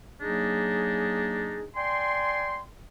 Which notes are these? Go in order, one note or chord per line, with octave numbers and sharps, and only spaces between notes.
F#3 A#3 D4 D#4 G#4
D5 G5 G#5 C6